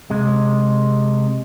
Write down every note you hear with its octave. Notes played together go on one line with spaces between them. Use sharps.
C3 G#3